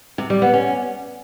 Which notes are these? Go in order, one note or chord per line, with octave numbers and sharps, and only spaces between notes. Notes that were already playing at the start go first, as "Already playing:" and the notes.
C3
G3
B3
C#4